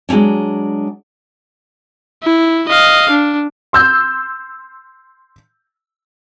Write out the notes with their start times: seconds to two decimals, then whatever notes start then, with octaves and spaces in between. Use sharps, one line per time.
0.09 F#3 G#3 A#3 C#4 D4
2.23 E4
2.69 D#5 F5
3.10 D4
3.73 C6 E6 G6